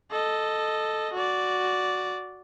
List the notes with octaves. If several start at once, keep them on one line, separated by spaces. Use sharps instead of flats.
A4 D#5
F#4 D5